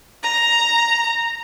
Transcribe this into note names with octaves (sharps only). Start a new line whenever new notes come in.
A#5